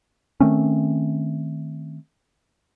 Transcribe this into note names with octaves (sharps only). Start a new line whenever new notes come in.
D#3 A3 C4 C#4